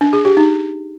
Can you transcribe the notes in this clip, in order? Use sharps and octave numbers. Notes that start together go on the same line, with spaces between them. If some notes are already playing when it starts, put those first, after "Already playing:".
D4
G#4
G4
D#4